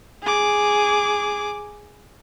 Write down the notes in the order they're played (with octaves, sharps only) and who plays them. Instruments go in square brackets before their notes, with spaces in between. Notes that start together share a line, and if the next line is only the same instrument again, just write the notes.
[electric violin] G#4 D6